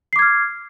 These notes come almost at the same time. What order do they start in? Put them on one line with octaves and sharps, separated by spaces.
C7 D6 G#6 F6